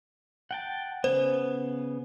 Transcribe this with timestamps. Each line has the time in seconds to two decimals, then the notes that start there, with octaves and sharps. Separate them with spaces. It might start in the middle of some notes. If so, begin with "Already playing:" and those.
0.51 F#5 G5 A5
1.04 C#3 B3 C5